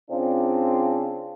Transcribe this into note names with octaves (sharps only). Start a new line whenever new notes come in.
C#3 C4 D4 F4